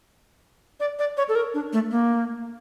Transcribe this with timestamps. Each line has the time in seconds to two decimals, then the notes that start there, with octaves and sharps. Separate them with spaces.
0.80 D5
0.99 D5
1.17 C#5
1.29 A4
1.35 A#4
1.54 D4
1.73 A3
1.91 A#3